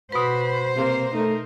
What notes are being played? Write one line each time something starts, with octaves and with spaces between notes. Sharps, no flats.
B2 F#4 B4 C5 B5
C3 A#3
A3 D#4 A#4